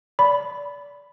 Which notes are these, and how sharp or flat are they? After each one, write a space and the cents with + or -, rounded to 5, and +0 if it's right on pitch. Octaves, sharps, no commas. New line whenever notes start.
D5 -25 B5 +0